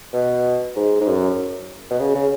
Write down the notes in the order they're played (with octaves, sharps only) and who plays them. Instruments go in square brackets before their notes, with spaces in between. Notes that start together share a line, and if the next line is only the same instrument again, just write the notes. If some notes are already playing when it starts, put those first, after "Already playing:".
[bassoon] B2
G#2
G#2
F#2
B2
C#3
C#3